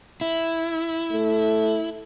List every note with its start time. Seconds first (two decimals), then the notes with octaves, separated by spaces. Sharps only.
0.21 E4
1.12 A3